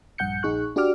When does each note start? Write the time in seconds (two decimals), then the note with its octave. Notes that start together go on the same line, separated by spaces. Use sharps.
0.18 A#1 G2 F#5 G6 C#7
0.43 A#1 D#4 G#4 C#6 F#6
0.76 D4 F#4 G4 D5 D6 F6